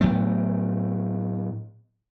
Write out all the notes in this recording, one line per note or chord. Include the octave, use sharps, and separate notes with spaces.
A2 F#3 A3 B3